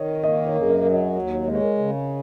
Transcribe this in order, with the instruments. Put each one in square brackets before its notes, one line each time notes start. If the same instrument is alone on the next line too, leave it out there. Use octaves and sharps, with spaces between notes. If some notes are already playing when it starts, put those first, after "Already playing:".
Already playing: [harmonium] D#3 [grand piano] C#5 D#5
[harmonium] A#3 [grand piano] D#5
[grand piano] C#5
[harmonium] F#2
[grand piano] G#4
A#4
[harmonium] F#3
[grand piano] D#5
[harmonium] D#2
[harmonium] G#3 [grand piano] D#5
[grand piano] C#5
A#4
[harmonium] C#3